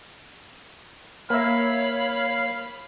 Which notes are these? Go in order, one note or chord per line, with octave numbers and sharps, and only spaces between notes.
A#3 C#5 E5 F5 B5